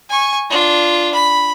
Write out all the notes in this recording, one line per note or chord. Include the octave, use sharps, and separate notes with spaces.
G#5 C#6
D4 F4
B5